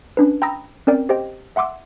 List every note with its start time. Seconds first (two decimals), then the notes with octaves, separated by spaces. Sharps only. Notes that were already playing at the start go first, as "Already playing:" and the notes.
0.17 C#4 D4 B4
0.42 G5 A#5 B5 D#6 E6 A#6
0.87 C4 C#4 A#4 D5 G5
1.09 G4 C5 D#5 G5
1.56 E5 F#5 C6 D6 E6